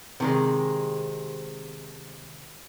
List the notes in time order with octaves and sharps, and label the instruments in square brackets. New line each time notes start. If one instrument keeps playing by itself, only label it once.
[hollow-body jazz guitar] C3 D#3 G#3